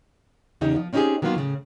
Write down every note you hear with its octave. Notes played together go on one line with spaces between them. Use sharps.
E2 C#3 D#4 G4
F3
C4 C#4 D#4 F4 G4 G#4
D#3 F#3 A#3 B3 F4
A2 C#3